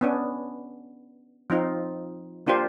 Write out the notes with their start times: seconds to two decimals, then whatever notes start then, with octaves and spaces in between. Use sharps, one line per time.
0.01 B3 C#4 D4
1.50 F3 C4 D#4 F4
2.47 A#3 D4 F4 G4 C5